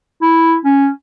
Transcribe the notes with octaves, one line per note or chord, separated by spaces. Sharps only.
E4
C#4